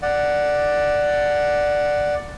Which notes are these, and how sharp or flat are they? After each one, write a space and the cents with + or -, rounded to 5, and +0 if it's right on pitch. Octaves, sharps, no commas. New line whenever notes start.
D5 +5 F#5 +0